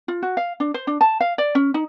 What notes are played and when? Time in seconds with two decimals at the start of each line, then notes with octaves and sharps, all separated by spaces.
0.08 F4
0.23 F#4
0.37 F5
0.60 D4
0.74 C5
0.87 D4
1.01 A5
1.21 F5
1.38 D5
1.55 C#4
1.74 D#4